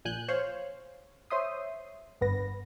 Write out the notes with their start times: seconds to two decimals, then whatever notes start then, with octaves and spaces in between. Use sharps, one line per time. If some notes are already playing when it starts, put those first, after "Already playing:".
0.05 A#1 A#2 G#5 F#6 G6
0.28 C5 C#5 F5
1.31 C5 C#5 E5 C6 D#6
2.21 G1 G2 B3 B4 A#6